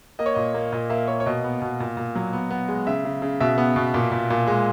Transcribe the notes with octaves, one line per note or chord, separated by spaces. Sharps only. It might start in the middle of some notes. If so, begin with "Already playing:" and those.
A#3 D#5
C#5
A#2 D#5
A#3
A#2 D#5
A#3 E5
A#3 C#5
C#5
B2 D#5
B3
B2
A#2
A#2
F#3
B3
B3
G#3
C#3 E5
C#3
C#3
B2 E5
B3
B2
A#2
A#2
A#2
G#3